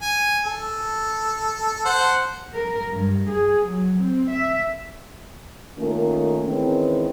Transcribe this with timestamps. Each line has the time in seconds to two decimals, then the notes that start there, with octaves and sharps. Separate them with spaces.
0.02 G#5
0.45 A4
1.85 C5 F#5
2.54 A#4
2.93 G2
3.29 G#4
3.65 F#3
3.99 C4
4.30 E5
5.79 D#3 A3 A#3 C#4 F4 A#4
6.47 D#3 E3 G#3 C4 C#4 D#4